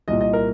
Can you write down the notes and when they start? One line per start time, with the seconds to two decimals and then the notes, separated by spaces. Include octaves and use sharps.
0.08 C2 A#2 D#5
0.21 D#5
0.33 A#4